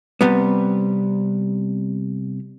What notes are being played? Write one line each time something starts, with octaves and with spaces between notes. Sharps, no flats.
C3 G3 B3